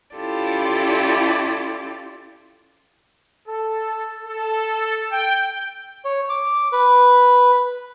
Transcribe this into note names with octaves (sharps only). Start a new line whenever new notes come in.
C#4 E4 F4 G4 A4 D5
A4
A4
G5
C#5
D6
B4